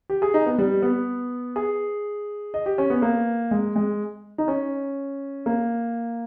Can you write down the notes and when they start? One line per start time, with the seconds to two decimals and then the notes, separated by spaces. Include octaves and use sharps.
0.10 G4
0.22 G#4
0.34 D#4
0.46 B3
0.58 G3
0.82 B3
1.56 G#4
2.54 D#5
2.66 G4
2.78 C#4
2.90 B3
3.02 A#3
3.51 G#3
3.76 G#3
4.38 D#4
4.48 C#4
5.46 A#3